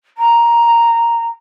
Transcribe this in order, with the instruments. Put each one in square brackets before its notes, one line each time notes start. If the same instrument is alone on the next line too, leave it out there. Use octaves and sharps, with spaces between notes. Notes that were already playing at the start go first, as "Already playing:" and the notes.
[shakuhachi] A#5